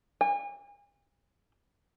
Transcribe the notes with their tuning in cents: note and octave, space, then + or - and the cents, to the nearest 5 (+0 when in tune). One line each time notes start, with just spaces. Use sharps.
G#5 -40